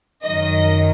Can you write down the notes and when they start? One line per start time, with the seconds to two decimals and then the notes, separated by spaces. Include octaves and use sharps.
0.23 F#2 D#3 F#3 D#5